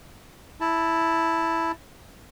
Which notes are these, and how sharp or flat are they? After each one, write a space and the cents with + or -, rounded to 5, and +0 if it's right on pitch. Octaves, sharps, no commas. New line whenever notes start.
E4 +0 A5 +0